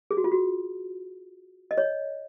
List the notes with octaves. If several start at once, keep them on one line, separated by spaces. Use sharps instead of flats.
G#4
F#4
F4
F#4
D#5
C#5